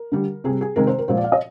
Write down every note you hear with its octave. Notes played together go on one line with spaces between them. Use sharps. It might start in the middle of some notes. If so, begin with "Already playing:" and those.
Already playing: A#4
D3 G3
C3 G3 G#4
G#4
C3 D#3 G#3 A#4
C5
A#4
A#2 F3 G#3 C5
D5
F5
D#5